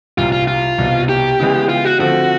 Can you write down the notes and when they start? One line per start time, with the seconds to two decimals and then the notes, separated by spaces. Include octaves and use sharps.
0.18 C2 A#2 G3 F4
0.32 F4
0.47 F4
0.78 C2 B2 G3
1.09 G4
1.39 C#3 E3 G#3 B3
1.69 F4
1.85 F#4
2.00 D3 F3 A3 C4 F#4